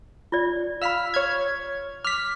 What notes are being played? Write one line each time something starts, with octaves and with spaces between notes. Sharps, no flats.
F4 D5
F5 B5 E6 F6 B6
C#5 F6 G#6
D6 F6 B6